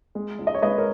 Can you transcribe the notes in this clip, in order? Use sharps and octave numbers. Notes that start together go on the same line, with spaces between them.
G#3
C#2
D#5
C#5
G#3 B4 D#5
A#4 C#5